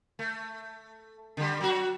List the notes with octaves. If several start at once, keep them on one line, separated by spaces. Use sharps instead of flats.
A3
D3 G3
F#3 F#4